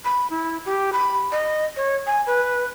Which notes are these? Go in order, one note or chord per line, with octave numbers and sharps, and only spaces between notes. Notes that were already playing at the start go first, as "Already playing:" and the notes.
B5
E4
G4
B5
D#5
C#5
G#5
B4